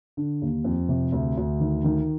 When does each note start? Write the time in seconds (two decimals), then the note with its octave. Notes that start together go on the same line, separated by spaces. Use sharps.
0.17 D3
0.42 D#2
0.64 F2
0.89 C3
1.12 D2
1.37 D2
1.60 D#3
1.84 D#3